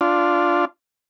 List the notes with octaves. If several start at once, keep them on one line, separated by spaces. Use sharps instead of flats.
D4 F4